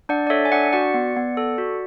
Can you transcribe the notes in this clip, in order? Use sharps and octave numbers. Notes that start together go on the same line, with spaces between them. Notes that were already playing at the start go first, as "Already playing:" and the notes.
D4 D5 F#5
D5
A4 C#5 E5
G#5
D4 D5 F#5
F#4 D5 F#5
B3
B3
A4
F#4